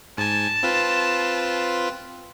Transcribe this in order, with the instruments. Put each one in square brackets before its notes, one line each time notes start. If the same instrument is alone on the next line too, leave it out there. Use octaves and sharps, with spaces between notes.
[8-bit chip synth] G#2 G#5 [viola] A5
[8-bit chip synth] C4 F4 B4